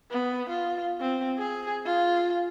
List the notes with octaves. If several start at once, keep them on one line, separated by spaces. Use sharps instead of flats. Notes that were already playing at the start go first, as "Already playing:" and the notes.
B3
F4
C4
G#4
F4